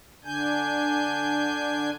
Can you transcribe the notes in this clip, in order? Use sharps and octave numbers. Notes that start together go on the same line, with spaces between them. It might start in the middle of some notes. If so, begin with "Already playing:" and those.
D3 D4 G#5 G6